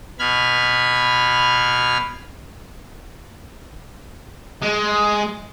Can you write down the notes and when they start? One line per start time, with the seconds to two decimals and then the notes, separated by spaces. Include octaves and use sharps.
0.19 B2 B5 F6 G#6
4.62 G#3